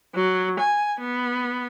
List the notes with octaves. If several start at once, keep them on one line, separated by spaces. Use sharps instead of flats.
F#3
G#5
B3